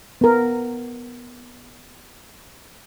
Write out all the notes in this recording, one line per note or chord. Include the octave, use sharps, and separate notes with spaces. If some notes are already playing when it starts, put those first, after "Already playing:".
B3 A#4